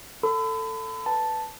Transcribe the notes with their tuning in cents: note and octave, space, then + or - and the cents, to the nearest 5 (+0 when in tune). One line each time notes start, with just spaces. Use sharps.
A4 +15 B5 +35
B4 +0 A5 +0